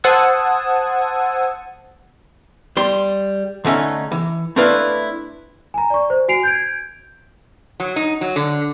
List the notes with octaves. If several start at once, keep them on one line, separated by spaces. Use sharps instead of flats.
C5 F#5 A5 D#6 E6 G#6
G3 C6
D3 A3 C#4 D#4
E3
A3 C4 D4 E4 B4 F5
G#5 A#5
D5 C#6
C5
F#4 G#5 C7 D7 F7
G6 G#6 D7
F#3
D#4
F#3
D3